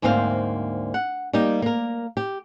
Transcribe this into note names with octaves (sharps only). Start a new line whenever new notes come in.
D2 G#2 A#3 C4 C5 F5
F#5
G3 A#3 D#4 G4
A#3 A#4
G4